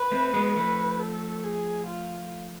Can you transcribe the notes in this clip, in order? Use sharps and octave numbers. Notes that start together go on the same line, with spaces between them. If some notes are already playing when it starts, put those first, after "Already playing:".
Already playing: B4
A3 C4
G#3 B3
F3 A3 B4
A4
G#4
F4